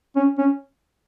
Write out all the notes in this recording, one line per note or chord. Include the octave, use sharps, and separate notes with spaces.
C#4
C#4